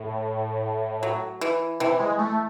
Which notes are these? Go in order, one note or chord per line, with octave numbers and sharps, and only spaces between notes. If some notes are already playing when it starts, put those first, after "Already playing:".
Already playing: A2
F#3
E3
C3 E3
G#3
A3